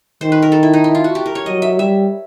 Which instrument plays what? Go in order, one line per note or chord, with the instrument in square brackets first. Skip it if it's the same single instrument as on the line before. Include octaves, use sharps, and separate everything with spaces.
[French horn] D#3 [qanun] C5
[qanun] B4
A#4
A4
E4
D#4
E4
F4
F#4
G4
A#4
C#5
[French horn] F#3 [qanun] D#5
[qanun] E5
[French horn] G3 [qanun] E5